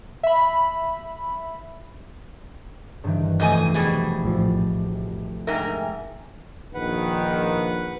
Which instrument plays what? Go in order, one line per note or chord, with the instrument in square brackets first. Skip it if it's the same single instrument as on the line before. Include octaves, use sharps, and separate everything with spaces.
[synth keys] E5 B5
[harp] G2 D#3 E3
[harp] F1 A3 G6 [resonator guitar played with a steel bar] F2 D#5 G#5
[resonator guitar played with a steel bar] B2 G3 G#4
[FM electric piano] A#1 A2 F3
[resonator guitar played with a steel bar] G#2 A#4 [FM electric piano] E5 G5 G#5
[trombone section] A#1 D#3 [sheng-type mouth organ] B4 F#5